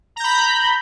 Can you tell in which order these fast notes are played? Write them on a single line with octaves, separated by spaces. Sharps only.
A#5 G6 B5